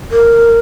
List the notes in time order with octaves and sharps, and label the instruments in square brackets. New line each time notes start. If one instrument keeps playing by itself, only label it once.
[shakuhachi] A#4